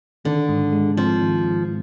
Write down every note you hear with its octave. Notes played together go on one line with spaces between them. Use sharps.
D3 D#3
G#2
G#3
F3 C4
D#3
G#2